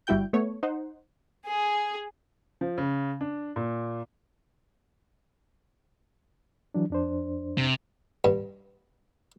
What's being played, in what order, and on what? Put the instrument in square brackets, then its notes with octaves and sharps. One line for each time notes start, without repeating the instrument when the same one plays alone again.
[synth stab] G1 G3 E4 F#4 G5 G6
A3 B3 C#5
D#4 C5 F#5
[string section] G#4
[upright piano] F3
C#3
D4
A#2
[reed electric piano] E3 F#3 D4
F2 D4 C5
[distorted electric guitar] C3
[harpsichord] G2